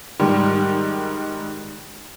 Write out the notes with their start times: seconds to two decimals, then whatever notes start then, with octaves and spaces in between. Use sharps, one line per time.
0.20 G#2 D#3 G3